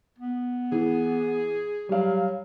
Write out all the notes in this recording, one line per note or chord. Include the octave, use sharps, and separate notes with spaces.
B3
E3 G#4
F#3 G3 F5